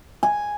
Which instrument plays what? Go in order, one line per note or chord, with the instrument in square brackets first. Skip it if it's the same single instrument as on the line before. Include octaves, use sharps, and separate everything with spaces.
[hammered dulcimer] G#5